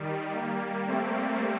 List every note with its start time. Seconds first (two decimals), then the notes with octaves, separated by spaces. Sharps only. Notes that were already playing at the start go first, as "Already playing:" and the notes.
Already playing: D#3 G3
0.33 G3 A#3
0.87 A3 C4